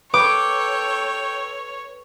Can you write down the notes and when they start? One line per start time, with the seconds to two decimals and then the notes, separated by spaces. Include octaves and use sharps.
0.14 A4 B4 C#5 G5 D6